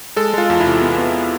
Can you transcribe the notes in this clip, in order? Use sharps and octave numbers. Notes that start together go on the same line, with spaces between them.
G#3 A4
G#3 F4
E2
E4
C3
B3
B3